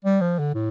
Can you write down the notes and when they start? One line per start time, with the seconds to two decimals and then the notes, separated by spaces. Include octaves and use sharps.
0.05 G3
0.21 F3
0.39 D3
0.55 A2